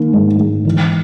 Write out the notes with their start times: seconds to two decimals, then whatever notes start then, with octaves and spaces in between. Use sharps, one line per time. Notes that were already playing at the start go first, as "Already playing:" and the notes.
Already playing: D#3 A#3
0.13 G#2
0.39 G#2
0.65 E3